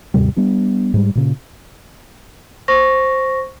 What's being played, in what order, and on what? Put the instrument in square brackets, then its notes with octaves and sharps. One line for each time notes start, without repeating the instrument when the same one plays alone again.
[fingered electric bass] D#2 G#2 C3 G3
G3 B3 D4
G#2 G3
A#2 C#3
[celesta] C5 C#6 A#6